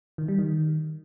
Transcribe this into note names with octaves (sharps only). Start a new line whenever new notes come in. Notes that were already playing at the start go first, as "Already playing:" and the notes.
D#3
G3
D#3